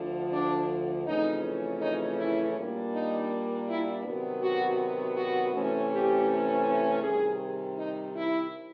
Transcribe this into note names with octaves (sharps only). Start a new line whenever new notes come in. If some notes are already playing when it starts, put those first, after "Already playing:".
Already playing: D2 D3 F3
D4
F2 C#3 E3 A3 C#4 D#4
D#4
E4
A#2 G3 A#3 D4
D#4
E4
C3 D#3 F#3 B3
F#4
F#4
C3 E3 A3 C#4
G4
C3 D#3 G3 G#4
D#4
E4